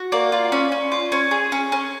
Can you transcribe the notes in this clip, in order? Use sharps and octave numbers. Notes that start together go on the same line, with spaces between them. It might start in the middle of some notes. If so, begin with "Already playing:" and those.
Already playing: F#4
A#3 D5
F4
C#4
C#4
F4
C#4
G#4
C#4
C#4